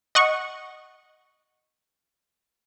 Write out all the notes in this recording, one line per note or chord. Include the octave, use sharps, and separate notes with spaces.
D#5 F#5 C#6